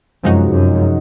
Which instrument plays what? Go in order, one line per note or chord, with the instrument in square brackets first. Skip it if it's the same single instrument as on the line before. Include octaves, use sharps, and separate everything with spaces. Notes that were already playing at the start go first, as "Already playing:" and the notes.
[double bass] F#2 [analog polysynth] C3 F3 G#3 D#4 F#4
[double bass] F#2